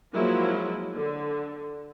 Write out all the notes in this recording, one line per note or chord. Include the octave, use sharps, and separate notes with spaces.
F3 F#3 G#3 A#3 E4
D3